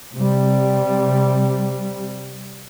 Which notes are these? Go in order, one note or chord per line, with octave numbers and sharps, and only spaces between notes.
C3 G3